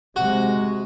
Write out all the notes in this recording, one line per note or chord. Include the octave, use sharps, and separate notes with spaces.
C3 G#3 F#4